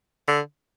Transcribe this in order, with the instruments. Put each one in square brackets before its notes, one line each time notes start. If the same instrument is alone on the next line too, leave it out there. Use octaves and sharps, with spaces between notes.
[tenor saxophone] D3